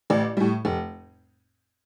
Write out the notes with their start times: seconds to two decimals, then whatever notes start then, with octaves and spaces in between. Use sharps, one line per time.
0.10 A1 D5
0.37 A2 G3
0.65 F1